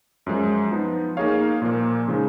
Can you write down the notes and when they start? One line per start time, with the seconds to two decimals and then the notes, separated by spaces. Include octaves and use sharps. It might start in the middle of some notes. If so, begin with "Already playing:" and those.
0.26 F#2 F3 G#3
0.72 F3 B3 D#4
1.17 A#3 D#4 G#4 C#5 F5
1.62 A#2 F3 A#3
2.08 C#3 F3 G#3 D#4